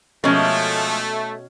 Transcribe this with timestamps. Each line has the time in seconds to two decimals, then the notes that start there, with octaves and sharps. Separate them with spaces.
0.24 B2 F3 G#3 A3 C#4 A#4